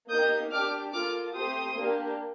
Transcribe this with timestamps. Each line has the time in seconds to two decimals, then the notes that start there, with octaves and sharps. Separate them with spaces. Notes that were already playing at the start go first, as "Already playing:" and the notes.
0.10 A#3 D#4 G4 D#6 G6
0.51 D4 G4 D6 F6
0.93 A#3 F4 A4 D6 F6
1.35 A3 C4 G4 C6 D#6
1.77 A#3 D4 G4